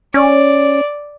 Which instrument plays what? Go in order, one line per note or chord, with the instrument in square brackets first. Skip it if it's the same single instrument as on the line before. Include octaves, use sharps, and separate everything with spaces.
[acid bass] C#4 [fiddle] D5